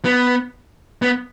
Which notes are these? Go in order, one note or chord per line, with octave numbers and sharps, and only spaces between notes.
B3
B3